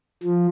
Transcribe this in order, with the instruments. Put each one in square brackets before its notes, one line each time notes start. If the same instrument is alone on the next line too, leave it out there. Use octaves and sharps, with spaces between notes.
[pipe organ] F3